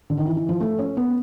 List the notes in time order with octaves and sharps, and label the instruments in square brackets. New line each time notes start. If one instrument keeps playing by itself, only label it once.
[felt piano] D3
D#3
E3
E3
F3
A3
C#4
B3